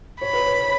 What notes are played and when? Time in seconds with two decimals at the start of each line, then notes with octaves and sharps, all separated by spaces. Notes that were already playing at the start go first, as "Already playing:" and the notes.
0.21 C#5 B5
0.33 B4
0.46 C#5